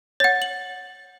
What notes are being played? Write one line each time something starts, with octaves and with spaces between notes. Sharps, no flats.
C#5 F#5 A6
F#7